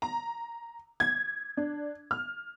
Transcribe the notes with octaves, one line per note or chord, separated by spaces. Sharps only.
A#5
G#6
D4
F6